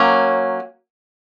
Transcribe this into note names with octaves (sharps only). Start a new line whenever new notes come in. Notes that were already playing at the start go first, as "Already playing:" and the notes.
Already playing: F#3 A#3 C#4